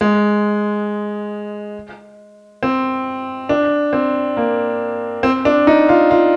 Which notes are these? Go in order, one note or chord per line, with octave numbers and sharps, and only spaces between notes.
G#3
C4
D4
C4
A#3
C4
D4
D#4
F4
F4